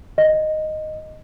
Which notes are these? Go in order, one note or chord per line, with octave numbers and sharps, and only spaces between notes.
D#5